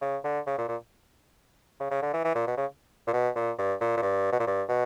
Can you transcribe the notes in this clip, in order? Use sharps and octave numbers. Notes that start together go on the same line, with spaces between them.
C#3
D3
C#3
A#2
A#2
C#3
C#3
D3
E3
E3
A#2
B2
C#3
A#2
B2
A#2
G2
A#2
A#2
G2
B2
A#2
G2
B2